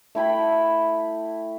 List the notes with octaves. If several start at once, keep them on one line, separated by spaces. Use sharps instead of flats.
A3 E4 G5 B5